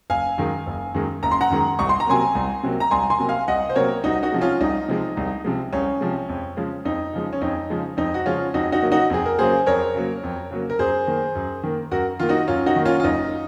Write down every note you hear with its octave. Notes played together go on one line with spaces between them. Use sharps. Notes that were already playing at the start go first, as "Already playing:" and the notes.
F#1 F5 G#5
F#2 D#3 G#3
F#1
F#2 D#3 G#3
F#1 A#5
C6
F#5 A#5
F#2 D#3 G#3
C2 C#6
C6
A#5
C3 F#3 A#3 G#5 C6
C2
C3 F#3 A#3
A#5
C2 G#5 C6
G#5 C6
C3 F#3 A#3
F5 G#5
C2 D#5 F#5
C5
C3 F#3 A#3 A#4 C#5
C2 D#4 F#4
D#4 F#4
C3 F3 G#3
C#4 F4
C2 D#4
C3 F3 G#3
C2
C3 F3 G#3
C2 C#4
C3 F3 G#3
F2
C#3 F3 G#3
F2 D#4
C#3 F3 G#3
C#4
F2 D#4
C#3 F3 G#3
F2 D#4
F#4
C#3 F3 G#3 C#4 F4
F2 D#4 F#4
D#4 F#4
C#3 F#3 A#3
D#4 F#4
F2 G#4
A#4
C#3 F#3 A#3 G#4 C5
F2 A#4 C#5
C#3 F#3 A#3
F2
C#3 F#3 A#3
A#4
F#2 G#4 C5
D#3 A#3
F#2
D#3 A#3
F#2 F#4 A#4
D#3 A#3 F4
D#4 F#4
F#2 C#4 F4
D#4 F#4
D#3 A#3
C#4 F4
F4
F#1 D#4